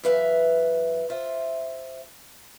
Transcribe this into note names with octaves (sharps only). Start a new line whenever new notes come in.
F#2 E3 B4 E5 F5
F4 C5 E5